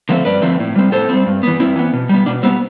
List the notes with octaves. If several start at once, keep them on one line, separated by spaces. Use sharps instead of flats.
D3 F3 A3 C4
G2 B4 D5
D3 F3 A3 C4
A2
G3 C4
A2 A4 C5
G3 C4
G2
E3 B3
G2 C4 E4
E3 B3
B2
G3 B3
B2 D4
G3 B3 C4